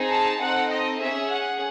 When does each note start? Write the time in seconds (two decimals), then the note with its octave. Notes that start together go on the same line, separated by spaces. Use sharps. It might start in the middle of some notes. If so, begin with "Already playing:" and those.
Already playing: C4 D#4 G#4
0.10 A5
0.40 C4 D#4 A4 F#5
0.70 D#5
1.00 C#4 G#4 E5
1.31 F#5